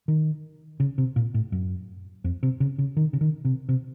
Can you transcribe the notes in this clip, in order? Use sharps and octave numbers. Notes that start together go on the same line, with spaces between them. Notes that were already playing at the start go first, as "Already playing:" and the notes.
D#3
C#3
C3
A#2
A2
F#2
F2
C3
C#3
C#3
D#3
C#3
D#3
C3
C3